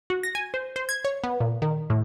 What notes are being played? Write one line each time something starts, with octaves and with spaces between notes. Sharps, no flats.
F#4
A#6
G#5
C5
C5
G#6
C#5
B3
A#2
D#3
A2